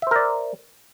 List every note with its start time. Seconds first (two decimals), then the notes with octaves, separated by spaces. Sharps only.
0.02 E5
0.07 C5
0.11 A#4
0.16 D5